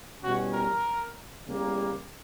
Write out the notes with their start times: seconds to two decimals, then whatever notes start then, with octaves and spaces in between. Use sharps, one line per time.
0.23 E2 B2 G3 C#4 F#4
0.54 A#4
1.46 E2 C#3 G3 A#3